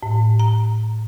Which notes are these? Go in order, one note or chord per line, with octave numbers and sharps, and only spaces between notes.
A2
A#5